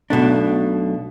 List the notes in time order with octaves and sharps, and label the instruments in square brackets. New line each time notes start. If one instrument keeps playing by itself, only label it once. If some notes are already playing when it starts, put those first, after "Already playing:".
[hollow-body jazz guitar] B1 B2 A3 D4